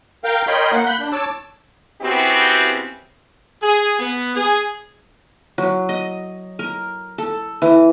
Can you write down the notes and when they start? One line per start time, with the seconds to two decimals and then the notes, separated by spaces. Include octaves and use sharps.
0.24 A#4 F5 G5
0.47 A#4 C#5 D#5 G5 B5 C6
0.73 A#3 F#5
0.86 B5 F#6 G6
1.00 D4
1.12 C#5 A5 D6 E6
2.01 C#3 B3 C4 E4 F#4 G4
3.62 G#4
3.99 B3
4.35 G#4
5.58 F#3
5.89 D#5
6.59 A#4
7.18 A4
7.62 E3